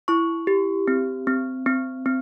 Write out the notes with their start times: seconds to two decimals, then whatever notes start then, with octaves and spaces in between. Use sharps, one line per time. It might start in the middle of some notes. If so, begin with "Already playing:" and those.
0.08 E4 C#6
0.47 G4
0.88 C4
1.27 C4
1.66 C4
2.06 C4